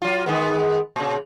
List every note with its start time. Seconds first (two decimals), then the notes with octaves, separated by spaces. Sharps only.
0.02 F#3 F4
0.26 D#3 G#3 B3
0.96 A#2 C#3